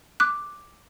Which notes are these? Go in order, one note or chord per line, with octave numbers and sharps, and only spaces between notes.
D6 F#6